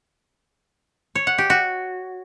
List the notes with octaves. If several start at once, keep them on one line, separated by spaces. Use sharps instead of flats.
C#5
F#5
G4
F#4